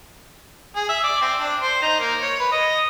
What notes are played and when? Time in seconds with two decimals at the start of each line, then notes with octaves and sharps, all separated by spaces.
0.76 G#4
0.89 E5
1.04 D5
1.21 C4
1.40 D4
1.62 C5
1.82 D#4
2.00 A#3
2.21 C#5
2.40 B4
2.52 D#5